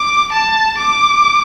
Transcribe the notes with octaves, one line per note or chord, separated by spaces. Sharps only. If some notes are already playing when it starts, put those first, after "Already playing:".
Already playing: D6
A5
D6